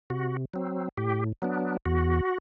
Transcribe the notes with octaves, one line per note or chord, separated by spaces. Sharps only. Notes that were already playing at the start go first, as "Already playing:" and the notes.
C3 F#4
F#3 C4
A2 G4
F#3 B3 D4
E2 F#4